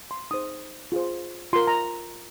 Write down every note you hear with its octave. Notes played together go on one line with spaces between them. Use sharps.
C6
D#4 G#4 C5 D#6
F4 G#4 C5
F4 A#4 C6
A#5